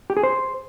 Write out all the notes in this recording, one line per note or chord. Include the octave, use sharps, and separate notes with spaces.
G4
G#4
C5